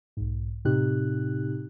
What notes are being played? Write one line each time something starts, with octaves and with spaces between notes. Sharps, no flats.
B1 G#2
A2 C3 C4 D#4 G4 F#6